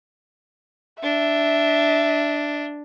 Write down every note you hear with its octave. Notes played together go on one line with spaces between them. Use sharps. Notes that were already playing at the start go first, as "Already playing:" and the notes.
D4 E5